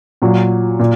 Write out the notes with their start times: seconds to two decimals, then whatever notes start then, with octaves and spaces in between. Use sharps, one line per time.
0.22 A#2 F#3
0.79 A#2